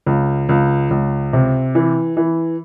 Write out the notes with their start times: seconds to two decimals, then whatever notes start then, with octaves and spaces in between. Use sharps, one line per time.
0.06 C#2
0.49 C#2
0.91 C#2
1.33 C3
1.75 E3
2.17 E3